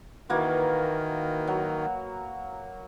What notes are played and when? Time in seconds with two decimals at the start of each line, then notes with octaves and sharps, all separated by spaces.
0.30 D#3 E3 A#3 F#4
1.47 F#3